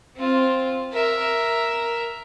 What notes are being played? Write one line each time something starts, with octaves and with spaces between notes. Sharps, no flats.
C4 F4
A#4 E5